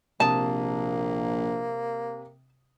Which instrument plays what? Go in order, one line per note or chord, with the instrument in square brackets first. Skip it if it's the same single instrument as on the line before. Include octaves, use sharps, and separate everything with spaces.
[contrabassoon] A#1 [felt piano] C3 D#6 [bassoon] A#3 [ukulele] A5